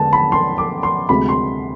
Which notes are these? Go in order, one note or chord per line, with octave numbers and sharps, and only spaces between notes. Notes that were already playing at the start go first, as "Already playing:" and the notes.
Already playing: E2 D3 G#3 B3 A5
B5
C6
D6
C6
D2 C3 G#3 B5
C6